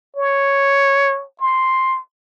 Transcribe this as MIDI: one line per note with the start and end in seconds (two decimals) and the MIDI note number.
0.17 1.24 73
1.40 1.99 84